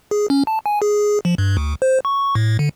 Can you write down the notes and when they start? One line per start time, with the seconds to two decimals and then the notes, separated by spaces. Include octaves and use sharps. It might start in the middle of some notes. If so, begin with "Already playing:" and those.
0.11 G#4
0.30 C#4
0.47 A5
0.66 G#5
0.82 G#4
1.25 F3
1.38 G2
1.57 D2
1.82 C5
2.05 C#6
2.35 A2
2.59 D3